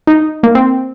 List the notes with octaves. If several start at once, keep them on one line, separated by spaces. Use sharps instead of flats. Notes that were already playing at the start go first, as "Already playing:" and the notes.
D#4
A#3
C4